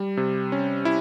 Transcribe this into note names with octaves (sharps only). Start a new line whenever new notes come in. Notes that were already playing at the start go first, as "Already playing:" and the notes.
Already playing: G3
C3
C#4
E4